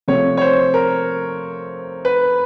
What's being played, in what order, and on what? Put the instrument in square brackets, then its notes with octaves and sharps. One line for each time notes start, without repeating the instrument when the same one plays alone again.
[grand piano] C3 F3 A3 C#5
C#5
C5
A#4
B4